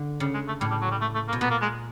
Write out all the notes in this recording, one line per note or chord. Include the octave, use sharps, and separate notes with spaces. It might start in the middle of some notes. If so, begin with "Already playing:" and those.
Already playing: D3
C#3 G3
G#3
A3
A2 G3
G3
F#3
G3
A3
A3
A#3
B2
A#2 B3
A#3
G#3